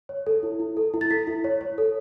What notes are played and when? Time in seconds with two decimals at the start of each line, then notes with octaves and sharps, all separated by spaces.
0.09 C#5
0.27 A4
0.43 E4
0.60 E4
0.77 A4
0.94 E4
1.01 A6
1.11 A4 B6
1.27 E4
1.44 C#5
1.61 C#5
1.78 A4